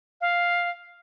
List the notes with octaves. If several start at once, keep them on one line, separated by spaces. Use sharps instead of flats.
F5